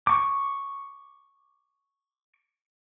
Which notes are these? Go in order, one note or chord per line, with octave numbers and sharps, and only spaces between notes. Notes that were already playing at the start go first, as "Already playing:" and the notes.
C#6 D6